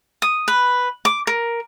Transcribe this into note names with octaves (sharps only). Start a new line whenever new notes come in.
D#6
B4
D6
A#4